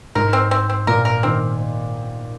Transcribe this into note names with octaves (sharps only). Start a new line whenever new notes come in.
G#2 A#4
C4
C4
C4
A#2 A#4
A#4
D#3 C4